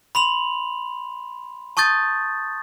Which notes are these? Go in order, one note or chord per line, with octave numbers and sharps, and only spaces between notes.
B5 C6 F7 F#7
A5 C#6 D#6 G6 A6